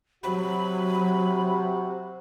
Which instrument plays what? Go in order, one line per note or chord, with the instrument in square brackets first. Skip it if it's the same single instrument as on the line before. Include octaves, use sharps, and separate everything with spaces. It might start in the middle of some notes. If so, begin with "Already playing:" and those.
[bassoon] C3 [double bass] F#3 [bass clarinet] F#4 [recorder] B5